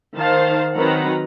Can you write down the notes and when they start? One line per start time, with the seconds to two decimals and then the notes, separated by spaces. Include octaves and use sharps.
0.16 D#3 C5 F5 A5
0.76 D#3 F#3 C4 B4 F#5 A#5